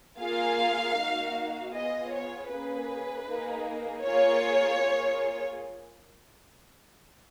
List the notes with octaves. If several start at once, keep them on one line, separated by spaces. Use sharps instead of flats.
A#3 F4 G#4 F5
A#3 D#4 F#4
B3 F4 G#4 D#5
C#5
A#3 C#4 G#4 B4
A#3 D#4 G#4
A#3 F4 G#4 C#5
A#3 F4 G#4